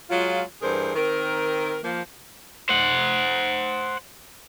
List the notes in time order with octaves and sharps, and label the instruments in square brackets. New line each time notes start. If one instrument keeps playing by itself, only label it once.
[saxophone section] F#3 G#3 F4
G2 E3 G#4 A#4 C5
D#3 C4 A#4
F3 A#3
[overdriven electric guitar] C5 F#5